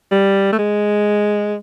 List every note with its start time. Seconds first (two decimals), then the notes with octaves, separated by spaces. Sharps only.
0.12 G3
0.52 A3
0.59 G#3